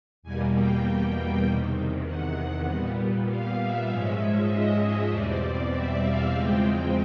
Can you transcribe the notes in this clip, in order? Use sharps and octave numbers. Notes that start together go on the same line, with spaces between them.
E2 B2 G3 A#3 G#5
G5
E2 C3 D#3
F#5
A#2 G3 B3
F5
E5
G#2 F3 G#3 C#4 E5
D#5
E2 B2 G3 C4 D5
E5
F5
E2 C#3 F3 G#3 C4 G5